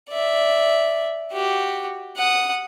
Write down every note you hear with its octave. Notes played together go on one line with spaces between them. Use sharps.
D5 E5
F#4 G4
F#5 D#6